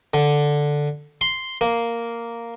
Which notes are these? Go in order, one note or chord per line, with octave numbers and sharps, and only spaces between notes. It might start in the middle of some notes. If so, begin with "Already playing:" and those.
D3
C6
A#3